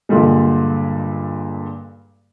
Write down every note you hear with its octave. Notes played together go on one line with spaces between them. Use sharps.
G2 A#2 D3 G3 G#3